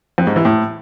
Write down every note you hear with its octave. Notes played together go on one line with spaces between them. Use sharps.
F2
G#2
E3
A2